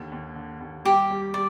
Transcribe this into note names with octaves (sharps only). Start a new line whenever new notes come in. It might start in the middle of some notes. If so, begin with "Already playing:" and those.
Already playing: D#2 D3
D#2
D3
D#2
G3 G4
G3
G3 D5